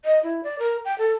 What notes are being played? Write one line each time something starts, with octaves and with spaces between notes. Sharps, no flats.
D#5
E4
D5
A#4
G5
A4